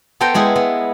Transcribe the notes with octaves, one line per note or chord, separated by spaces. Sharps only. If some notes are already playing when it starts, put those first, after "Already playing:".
B3 A4 C5 G5 A#5
G#3 B3 E4 G#4
B3